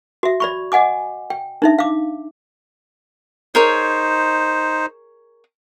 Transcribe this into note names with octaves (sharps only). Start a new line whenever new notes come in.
F#4 E5
D5 B5 C#6
D#5 F#5 G#5 D6
G5
D4 D#4 E5
F5 D6
D#4 G#4 A#4 C5 C#5